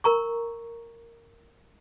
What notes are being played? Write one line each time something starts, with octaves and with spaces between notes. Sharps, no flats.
A#4 A#5 C#6